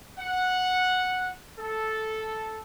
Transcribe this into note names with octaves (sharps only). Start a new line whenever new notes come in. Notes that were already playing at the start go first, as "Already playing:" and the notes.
F#5
A4